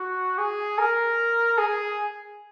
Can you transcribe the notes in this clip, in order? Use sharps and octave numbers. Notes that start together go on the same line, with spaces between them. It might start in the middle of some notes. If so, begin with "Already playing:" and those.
Already playing: F#4
G#4
A#4
G#4